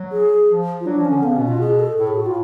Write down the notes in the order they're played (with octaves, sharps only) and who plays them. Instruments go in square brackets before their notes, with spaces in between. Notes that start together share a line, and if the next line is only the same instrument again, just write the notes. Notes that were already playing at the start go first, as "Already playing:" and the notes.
Already playing: [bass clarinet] F#3
[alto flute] G#4
[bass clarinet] F3
[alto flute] F4
[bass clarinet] F#3 [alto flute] D4
[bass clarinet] F3
[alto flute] C#4
[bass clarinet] D3
[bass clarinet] C#3 [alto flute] B3
[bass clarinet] B2 [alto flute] C#4
[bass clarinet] B2 [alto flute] F4
[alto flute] G#4
A4
[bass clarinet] A2 [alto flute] A4
[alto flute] G#4
[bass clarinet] A2 [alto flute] F#4
[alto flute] F4